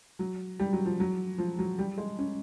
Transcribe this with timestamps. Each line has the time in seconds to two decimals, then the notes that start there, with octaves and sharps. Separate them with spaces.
0.19 F#3
0.60 G3
0.73 F#3
0.86 F3
1.00 F#3
1.38 F3
1.59 F#3
1.79 G3
1.98 G#3
2.19 C#4